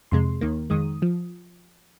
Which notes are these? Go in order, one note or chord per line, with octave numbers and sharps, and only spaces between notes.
F2 C3 G#3 C6
D#2 D#3 A#3
F2 D#3 G#3 D#6
F3